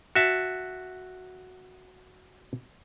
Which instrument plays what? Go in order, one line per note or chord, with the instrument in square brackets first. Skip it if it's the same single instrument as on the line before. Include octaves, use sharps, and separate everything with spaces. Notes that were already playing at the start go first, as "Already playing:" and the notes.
[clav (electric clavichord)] F#4 E5 A5